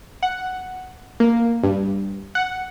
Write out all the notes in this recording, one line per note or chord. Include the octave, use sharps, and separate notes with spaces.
F#5
A#3
G2
F#5